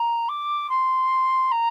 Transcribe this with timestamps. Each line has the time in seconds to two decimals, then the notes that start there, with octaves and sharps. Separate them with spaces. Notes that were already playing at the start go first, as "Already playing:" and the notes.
Already playing: A#5
0.28 D6
0.69 C6
1.51 A#5